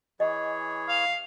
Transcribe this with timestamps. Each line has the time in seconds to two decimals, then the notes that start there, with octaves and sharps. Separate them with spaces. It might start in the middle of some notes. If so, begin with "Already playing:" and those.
0.20 E3 G#4 C#5 D#5
0.89 F5